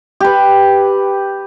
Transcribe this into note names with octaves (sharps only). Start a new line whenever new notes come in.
G4 B4